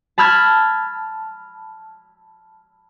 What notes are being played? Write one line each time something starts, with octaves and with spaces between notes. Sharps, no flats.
A5 B5 E6 F6 G#6